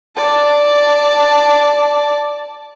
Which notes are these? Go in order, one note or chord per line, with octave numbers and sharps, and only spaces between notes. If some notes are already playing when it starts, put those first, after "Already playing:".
D5 A5